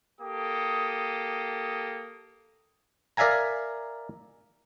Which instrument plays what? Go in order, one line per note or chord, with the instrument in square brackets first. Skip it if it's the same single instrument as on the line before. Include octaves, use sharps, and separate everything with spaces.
[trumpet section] A#3 G4 A4 D#6
[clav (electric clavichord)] A#4 D5 E5 F5 G#5 A#5